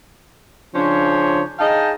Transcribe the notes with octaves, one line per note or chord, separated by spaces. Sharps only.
C#3 F3 C#4 D4 C5 C#5
D#4 G#4 D#5 F5 G5 A5